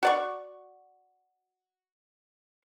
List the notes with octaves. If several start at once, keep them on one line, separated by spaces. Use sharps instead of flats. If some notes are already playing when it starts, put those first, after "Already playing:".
F#4 D5 C#6